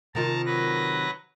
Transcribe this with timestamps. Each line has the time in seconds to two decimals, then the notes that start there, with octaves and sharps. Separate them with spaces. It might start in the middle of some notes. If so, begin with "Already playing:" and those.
0.15 C3 D#3 F4 A5 A#5
0.46 F#3 B4 A#6